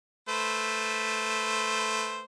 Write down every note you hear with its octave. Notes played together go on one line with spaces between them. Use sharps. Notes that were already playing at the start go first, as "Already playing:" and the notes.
A3 B4 C5